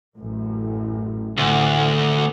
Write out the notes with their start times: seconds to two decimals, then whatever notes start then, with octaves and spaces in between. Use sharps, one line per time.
0.17 A1 F#2 A2
1.37 A1 D2